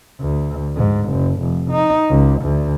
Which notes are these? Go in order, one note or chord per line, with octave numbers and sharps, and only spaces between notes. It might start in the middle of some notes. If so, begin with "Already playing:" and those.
D2
G#2
F#1
F1
D#4
C#2
D2